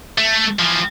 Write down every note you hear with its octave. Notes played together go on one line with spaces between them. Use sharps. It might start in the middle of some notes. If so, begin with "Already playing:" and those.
A3
E3 F3